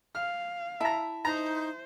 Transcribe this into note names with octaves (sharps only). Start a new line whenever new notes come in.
F5 F6
E4 E5 A5 A#5
D#4 C5 A#5